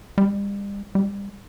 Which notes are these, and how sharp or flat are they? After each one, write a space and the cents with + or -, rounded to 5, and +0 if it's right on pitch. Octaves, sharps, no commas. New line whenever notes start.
G3 +40
G3 +30